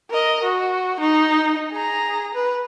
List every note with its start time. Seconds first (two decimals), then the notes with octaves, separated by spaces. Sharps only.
0.11 A#4 D#5
0.43 F#4
1.00 D#4
1.72 G#4 A#5
2.34 B4